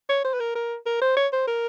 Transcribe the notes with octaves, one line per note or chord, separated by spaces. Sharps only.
C#5
C5
B4
A#4
A#4
A#4
C5
C#5
C5
A#4